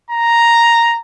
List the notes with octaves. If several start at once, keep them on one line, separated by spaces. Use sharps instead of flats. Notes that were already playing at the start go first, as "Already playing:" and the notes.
A#5